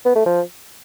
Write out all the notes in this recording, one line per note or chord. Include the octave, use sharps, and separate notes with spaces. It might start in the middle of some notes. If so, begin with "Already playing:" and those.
B3
A3
F3